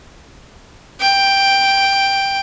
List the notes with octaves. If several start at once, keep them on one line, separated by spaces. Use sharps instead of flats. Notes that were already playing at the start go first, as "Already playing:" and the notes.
G5